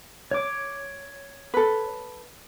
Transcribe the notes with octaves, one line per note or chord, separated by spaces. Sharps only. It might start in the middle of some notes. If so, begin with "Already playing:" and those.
C#5 D6
A4 B4